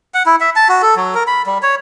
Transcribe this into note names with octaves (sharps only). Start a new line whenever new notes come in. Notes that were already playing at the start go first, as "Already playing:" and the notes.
F#5
E4
E5
A5
F#4
A4
F#3
A#4
B5
G3
C#5